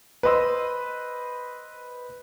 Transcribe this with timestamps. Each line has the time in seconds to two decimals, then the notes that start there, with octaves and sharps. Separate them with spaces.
0.23 B4 C5 D#5 C6 E6